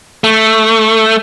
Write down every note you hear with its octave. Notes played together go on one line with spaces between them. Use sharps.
A3